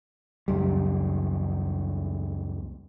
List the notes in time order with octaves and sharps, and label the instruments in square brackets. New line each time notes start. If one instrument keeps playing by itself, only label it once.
[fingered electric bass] C#2 F#2 G3